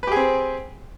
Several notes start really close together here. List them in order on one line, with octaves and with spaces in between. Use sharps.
B4 G4 G#4 C4